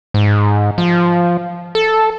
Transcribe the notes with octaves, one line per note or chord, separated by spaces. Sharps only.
G#2
F3
A4